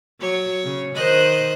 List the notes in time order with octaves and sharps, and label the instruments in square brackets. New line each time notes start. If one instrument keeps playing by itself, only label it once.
[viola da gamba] F#3 [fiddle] C#5
[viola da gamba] C#3
[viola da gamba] D#3 C5 [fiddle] D#5 F#6